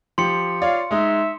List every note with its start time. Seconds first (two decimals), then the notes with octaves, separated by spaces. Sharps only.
0.18 F3 G4 C6 C#7
0.62 F4 C#5 D5 F5
0.91 G#3 D#4 E5